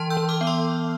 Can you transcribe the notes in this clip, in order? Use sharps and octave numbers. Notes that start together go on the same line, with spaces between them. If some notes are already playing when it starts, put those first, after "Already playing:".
Already playing: E3 A5 C6
E6 G6
E3
D6 F6
B3 D6
C6 E6